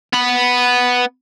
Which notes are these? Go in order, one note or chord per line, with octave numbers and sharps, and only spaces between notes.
B3 B5